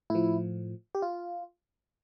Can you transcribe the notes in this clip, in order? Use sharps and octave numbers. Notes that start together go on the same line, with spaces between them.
A2 F3 E4
G4
F4